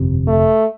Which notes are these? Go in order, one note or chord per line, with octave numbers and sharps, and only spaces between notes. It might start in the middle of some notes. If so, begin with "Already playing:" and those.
Already playing: G1 F2 C3
A3